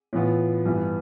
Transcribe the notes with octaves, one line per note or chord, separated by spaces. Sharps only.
A2 E3 B3 F4
G2 E3 B3